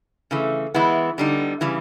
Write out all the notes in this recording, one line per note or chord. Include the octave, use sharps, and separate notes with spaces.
C#3 E3 A3
E3 G#3 B3 E4
D3 G3 B3 D#4
C#3 E3 G3